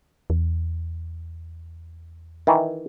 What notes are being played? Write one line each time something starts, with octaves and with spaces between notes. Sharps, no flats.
E2
D#3 E3